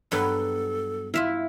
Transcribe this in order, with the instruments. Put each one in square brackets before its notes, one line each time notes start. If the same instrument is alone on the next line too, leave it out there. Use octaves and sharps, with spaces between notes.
[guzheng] G2 F#3 B3 [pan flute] A4
[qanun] E4 [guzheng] F4 E5 F5